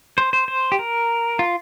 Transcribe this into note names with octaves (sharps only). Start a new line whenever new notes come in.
C5
C5
C5
G4
A#4
F4